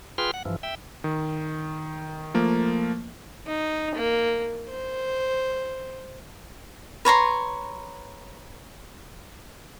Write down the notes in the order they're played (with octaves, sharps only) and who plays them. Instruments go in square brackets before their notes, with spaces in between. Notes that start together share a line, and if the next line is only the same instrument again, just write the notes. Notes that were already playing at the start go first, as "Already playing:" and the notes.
[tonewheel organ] F4 G#4 B4 G5 C6 F6
F#5
G2 E3 F3
E5 G5
[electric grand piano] D#3
F3 A3 A#3
[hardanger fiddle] D#4
A#3
C5
[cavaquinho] B4 C#5 A#5 C6